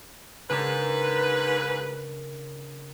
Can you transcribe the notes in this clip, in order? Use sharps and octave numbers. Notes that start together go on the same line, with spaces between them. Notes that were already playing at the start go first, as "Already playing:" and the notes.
G#2 C#3 D4 A#4 B4